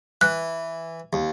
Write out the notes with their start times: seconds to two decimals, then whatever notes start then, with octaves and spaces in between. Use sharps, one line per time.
0.21 E3 F#6
1.13 D#2